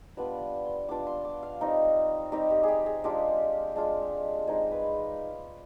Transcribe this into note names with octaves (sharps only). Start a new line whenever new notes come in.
G3 B3 D4 F4 B5
C6
G3 B3 D4 F4 D6
C6
D6
F5
G3 C4 D#4
G3 C4 D#4 G4
G4
G4 G#4
G#4
G#3 D4 F4 G4
G#3 D4 F4
G#3 C4 D#4 G#4
B4